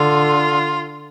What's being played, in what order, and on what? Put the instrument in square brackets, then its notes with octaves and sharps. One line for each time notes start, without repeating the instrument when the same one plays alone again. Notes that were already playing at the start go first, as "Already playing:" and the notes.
Already playing: [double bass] D3 [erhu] F4